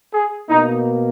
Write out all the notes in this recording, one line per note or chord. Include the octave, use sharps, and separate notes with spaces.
G#4
B2 A#3 D#4